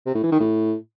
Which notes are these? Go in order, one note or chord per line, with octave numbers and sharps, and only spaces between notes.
C3
A2
E3
D#3
A2